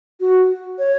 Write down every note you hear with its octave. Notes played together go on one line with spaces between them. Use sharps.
F#4
C#5